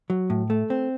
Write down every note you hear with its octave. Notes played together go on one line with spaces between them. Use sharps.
F#3
A2
A3
C4